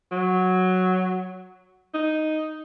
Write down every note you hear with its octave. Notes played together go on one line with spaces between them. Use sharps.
F#3
D#4